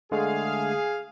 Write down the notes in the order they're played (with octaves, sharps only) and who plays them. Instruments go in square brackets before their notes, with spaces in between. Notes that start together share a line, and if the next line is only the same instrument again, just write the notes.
[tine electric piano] D3 G#3 A3 [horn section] G#4 F5